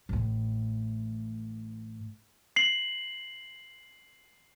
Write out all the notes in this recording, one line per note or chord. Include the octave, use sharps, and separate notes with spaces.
A1 A2
C7 F#7